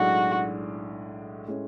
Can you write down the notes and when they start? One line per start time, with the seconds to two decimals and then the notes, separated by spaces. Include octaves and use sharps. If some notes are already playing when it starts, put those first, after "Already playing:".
Already playing: B1 A2 G#3 D4 F#4
1.47 A2 G#3 C#4